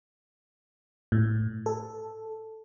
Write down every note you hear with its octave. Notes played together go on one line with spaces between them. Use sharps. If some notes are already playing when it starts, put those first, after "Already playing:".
A2
A4